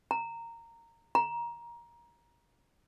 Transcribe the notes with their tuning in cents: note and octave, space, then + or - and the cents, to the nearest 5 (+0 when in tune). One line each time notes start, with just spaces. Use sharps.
A#5 -15
A#5 +20